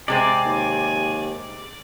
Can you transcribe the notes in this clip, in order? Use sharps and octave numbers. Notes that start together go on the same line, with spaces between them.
C3 G#3 C4 D5 G#5
D#2